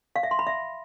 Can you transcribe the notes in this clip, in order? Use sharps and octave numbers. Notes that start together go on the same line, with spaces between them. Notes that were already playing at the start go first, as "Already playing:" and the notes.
F5
E5
C6
B5
E5